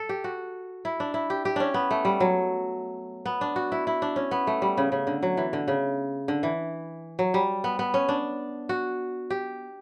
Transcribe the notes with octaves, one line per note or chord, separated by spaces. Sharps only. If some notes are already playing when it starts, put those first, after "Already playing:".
Already playing: A4
G4
F#4
E4
D4
E4
G4
G4
C#4 D4
B3
A3
G3
F#3
B3
D4
F#4
E4
E4
D4
C#4
B3
A3
G3
C#3
C#3
D3
F#3
E3
D3
C#3
D3
E3
F#3
G3
B3
B3
C#4
D4
F#4
G4